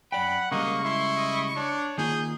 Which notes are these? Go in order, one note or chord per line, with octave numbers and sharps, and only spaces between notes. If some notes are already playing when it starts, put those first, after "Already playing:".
F#2 D5 F#5 G5 B5
C#3 G3 G#3 A#3 D#5 C#6
E4 C6
D#5
D4 C#5
D#3 A#3 F4 G#4 G6